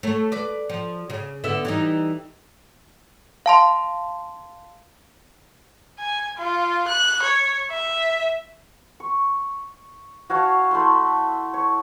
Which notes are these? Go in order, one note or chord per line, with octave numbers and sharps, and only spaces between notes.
A3 C#5
B4 D5
F3
C#3
D3 B3 E4
E3 G3 D#4
F5 A5 C6
G#5
F4
F#6
C#5
E5
C#6
F#4 C#5 F5 A5
A3 E4 C6
C#5